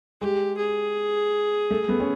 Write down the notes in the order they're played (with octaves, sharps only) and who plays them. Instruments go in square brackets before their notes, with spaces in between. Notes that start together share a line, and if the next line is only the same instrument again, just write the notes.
[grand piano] G#3 [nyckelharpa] G4
[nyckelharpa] G#4
[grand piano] A3
A3 B3
C#4